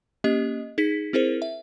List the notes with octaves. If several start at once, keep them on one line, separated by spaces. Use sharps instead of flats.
A#3 C#4 G4 D#5
D#4 G#4 B6
C4 E4 G#4 A#4 C5
E5